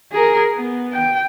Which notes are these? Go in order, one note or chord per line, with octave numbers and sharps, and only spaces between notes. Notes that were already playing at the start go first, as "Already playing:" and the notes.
G#4 A#4
B3
G5